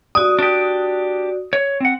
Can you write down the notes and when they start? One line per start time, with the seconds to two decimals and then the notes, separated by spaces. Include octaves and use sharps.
0.15 F#4 D5 D#6
0.39 D4 G4
1.53 C#5
1.80 C4 F#5